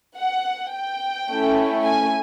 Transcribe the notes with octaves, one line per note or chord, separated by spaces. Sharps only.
F#5
G5
A3 C#4 E4
G#5